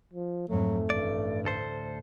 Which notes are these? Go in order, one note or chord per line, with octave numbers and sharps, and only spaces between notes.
F3
F2 G#2 F#3 A3
A1 G2 D5
D2 A4 C5